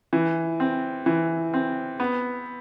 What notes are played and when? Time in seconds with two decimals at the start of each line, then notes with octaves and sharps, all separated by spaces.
0.13 E3
0.60 C4
1.06 E3
1.54 C4
2.00 B3